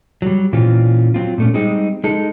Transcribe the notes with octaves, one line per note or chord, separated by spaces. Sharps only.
F#3 G3
A#2 E3 C4 C#4 F4
F#3 C4 F4
A#2 A3 C#4
G3 G#3 C4 D#4
G#3 D#4 A4